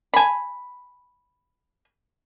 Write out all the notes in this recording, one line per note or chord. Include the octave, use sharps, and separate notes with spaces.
G#5 B5